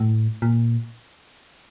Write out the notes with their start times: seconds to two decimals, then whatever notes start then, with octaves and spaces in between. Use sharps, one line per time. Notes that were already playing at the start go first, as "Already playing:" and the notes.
Already playing: A2
0.42 A#2